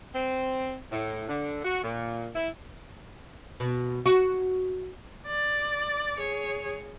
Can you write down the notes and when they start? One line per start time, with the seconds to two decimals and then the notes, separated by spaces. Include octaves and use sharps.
0.15 C4
0.92 A2
1.29 D3
1.65 F#4
1.84 A#2
2.36 E4
3.60 B2
4.06 F#4
5.27 D5
6.19 G#4 C#5